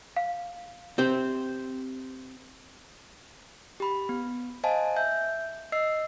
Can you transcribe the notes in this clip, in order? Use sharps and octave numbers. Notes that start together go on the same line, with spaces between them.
F5
C4 G4 C5
G4 B5
B3
C5 D#5 F5 G#5 A5
E5 G6
D#5 E6 C7